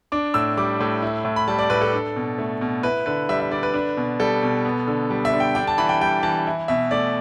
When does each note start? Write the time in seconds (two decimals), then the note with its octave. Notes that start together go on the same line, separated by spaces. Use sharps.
0.12 D4 D6
0.34 A2 E6
0.57 G3 D6
0.80 A2
1.02 E4
1.25 A2
1.36 B5
1.48 G3 A5
1.58 D5
1.70 A2 B4
1.81 A4
1.93 D4
2.16 B2
2.38 A3
2.61 B2
2.83 E4 B4
3.06 D3 B4
3.29 G3 E5
3.40 E5
3.51 D3 D5
3.63 B4
3.74 D4
3.97 B2
4.20 G3 A4
4.43 B2
4.65 B3
4.87 D3
5.10 G3
5.25 E5
5.33 D3
5.40 G5
5.55 D4 G5
5.67 A5
5.78 E3 B5
5.89 G5
6.01 G3 G5
6.23 E3 A5
6.47 E4
6.68 B2 E5
6.91 A3 D5